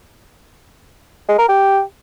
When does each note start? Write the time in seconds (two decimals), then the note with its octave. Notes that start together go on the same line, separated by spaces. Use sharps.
1.28 G#3
1.38 A#4
1.48 G4